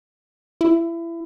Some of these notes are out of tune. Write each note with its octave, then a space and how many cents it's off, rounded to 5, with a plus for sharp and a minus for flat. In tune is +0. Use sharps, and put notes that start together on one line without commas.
E4 +25